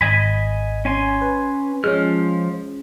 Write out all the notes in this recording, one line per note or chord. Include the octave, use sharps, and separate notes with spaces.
G#1 D#5 G#5 B5
C#4 G#5 C6
B4
F3 G#3 C#4 F6